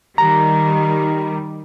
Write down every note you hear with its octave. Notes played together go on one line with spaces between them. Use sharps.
D#3 G3 A#5